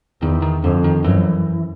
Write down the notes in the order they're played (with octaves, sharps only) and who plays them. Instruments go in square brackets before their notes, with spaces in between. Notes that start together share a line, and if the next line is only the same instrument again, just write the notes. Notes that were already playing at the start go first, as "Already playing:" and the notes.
[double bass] E2 [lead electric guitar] D#3
[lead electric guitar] D#3
[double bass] F2 [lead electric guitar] D3
[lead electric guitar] D#3
[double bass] F#2 [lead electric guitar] E3